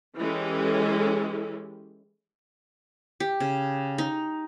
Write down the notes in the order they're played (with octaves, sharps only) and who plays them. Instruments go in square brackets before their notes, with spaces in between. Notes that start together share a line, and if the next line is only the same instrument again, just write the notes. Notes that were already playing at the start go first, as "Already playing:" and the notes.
[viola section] E3 G#3 C#4 G4 A4
[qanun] G4
C#3
D#4